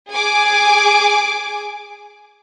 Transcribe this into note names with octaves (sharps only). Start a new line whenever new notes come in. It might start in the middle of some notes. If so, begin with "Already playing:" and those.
G#4 G#5 D6